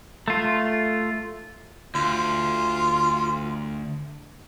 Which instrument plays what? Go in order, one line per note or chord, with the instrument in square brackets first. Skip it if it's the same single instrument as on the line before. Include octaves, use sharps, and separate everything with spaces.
[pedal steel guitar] A3 F4
[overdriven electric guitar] D2 [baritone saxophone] F4